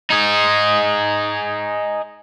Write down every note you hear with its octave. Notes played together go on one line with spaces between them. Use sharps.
D#4 G#4